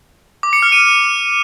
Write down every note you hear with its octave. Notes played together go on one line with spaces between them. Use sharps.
D6
C#7
F6
D#7